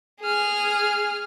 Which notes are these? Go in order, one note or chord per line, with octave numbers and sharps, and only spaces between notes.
G#4 F6